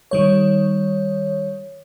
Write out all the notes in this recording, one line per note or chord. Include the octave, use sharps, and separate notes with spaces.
D#3 G3 C#5